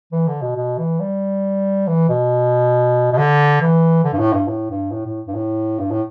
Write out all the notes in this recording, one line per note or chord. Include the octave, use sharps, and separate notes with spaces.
E3
D3
B2
B2
E3
G3
E3
B2
B2
D3
E3
D3
G2
A2
G2
A2
G2
A2
A2
G2
A2
G2
A2